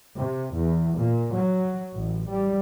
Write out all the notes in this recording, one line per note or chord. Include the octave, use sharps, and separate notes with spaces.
C3
E2
A#2
F#3
A1
G3